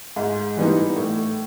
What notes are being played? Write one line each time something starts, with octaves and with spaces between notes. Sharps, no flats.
G#2
E3 G3 B3 D#4
A2